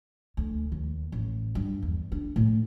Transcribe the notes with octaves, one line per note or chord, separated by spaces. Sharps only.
D2
D#2
A1
G2
E2
D4
A2